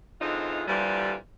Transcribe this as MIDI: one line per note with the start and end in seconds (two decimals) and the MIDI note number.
0.21 0.63 50
0.21 0.63 52
0.21 0.63 56
0.21 0.63 60
0.21 0.63 63
0.21 0.63 65
0.68 1.14 46
0.68 1.14 50
0.68 1.14 52
0.68 1.14 53
0.68 1.14 55